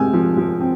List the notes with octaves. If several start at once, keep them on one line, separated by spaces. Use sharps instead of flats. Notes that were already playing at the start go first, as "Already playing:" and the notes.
Already playing: C3 G#3 G#5 E6 F6 G6
F3
F3
C4